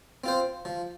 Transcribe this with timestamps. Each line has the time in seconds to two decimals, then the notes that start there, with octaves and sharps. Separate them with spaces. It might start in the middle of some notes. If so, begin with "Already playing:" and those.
0.24 C4 F4 C5
0.65 F3